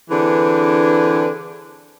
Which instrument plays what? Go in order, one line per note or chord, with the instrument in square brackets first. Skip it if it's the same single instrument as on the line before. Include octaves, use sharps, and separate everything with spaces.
[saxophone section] D3 E3 C4 D4 G#4 B4